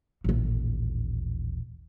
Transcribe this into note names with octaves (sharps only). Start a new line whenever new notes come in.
D#1 A1